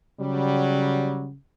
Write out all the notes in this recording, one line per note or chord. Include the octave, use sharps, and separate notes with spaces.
C#3 F#3 G3